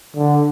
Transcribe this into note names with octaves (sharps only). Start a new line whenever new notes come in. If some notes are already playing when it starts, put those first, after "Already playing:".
D3